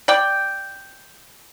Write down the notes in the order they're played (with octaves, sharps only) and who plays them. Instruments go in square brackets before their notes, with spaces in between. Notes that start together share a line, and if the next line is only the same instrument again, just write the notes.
[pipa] D5 G5